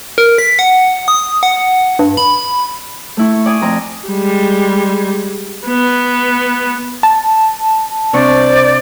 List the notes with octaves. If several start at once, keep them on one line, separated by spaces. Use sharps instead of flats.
A#4
B6
F#5
D#6
F#5
G2
B5
A3 E4 C#6
D5 G#5 D#6
F2 C4 A#5
G3 G#3
B3
A5
C3 D4 C5 D5 C#6